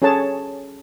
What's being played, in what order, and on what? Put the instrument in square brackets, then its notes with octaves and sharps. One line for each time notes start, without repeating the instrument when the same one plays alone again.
[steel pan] C#4 G#4 A4 C#5 A5